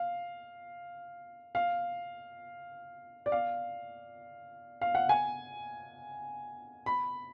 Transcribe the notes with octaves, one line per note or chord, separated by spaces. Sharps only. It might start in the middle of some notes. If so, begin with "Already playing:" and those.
Already playing: F5
F5
D5
F5
F5
F#5
G#5
B5